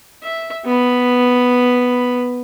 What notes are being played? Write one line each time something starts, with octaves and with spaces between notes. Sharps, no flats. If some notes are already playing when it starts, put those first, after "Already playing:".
E5
B3 B5